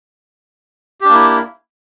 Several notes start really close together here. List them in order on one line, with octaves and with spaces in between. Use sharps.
G4 D4 A#3 E4